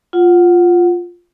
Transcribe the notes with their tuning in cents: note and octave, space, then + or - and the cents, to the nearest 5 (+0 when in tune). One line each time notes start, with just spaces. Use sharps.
F4 +0 F#5 +0